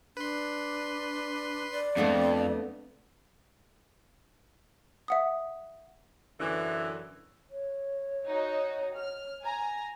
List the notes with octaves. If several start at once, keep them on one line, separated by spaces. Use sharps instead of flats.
D4 B4 C6
D5
F2 A3 B3 D4
E5 F#5 D#6
F#2 D3 E3
C#5
D#4 F#4
F6
G#5 A#5